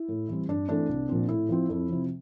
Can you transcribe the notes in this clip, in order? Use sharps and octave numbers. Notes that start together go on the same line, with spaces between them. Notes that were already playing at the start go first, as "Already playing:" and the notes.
Already playing: E4
A2
E3 G3 C4
G2 D4
E3 A3 C4 D4
C2
A#2 F3 C4
A2 E4
F3 C4
F2
C3 F3